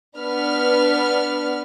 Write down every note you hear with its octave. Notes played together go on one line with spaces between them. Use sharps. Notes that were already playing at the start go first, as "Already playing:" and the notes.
B3 D4 B4 F6